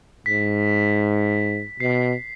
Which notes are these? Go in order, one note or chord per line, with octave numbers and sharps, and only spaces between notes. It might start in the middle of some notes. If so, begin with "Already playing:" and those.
G#2 B6
B2 C7